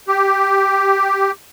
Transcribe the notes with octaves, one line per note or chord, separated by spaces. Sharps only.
G4